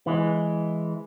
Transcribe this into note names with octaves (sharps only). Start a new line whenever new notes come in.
E3 G#3